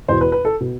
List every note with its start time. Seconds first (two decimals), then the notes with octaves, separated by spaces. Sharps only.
0.08 E2 B2 C5
0.21 B4
0.32 B4
0.45 A4
0.61 B2